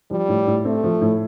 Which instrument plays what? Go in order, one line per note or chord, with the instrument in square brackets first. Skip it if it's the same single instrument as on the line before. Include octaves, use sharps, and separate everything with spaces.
[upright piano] F3 [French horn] G3
[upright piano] A2
A2
[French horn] A3 [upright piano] C4
[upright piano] F3
A2